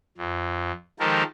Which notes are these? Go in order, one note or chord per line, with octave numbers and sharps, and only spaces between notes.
F2
D#3 F3 G#3 G4 A4 A#4